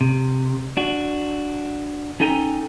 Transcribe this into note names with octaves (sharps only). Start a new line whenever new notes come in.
C3
D4 F#4
C#4 D#4 A4 G5 G#5 A#5